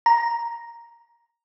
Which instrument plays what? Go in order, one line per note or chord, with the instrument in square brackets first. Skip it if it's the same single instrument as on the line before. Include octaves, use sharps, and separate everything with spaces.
[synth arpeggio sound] A#5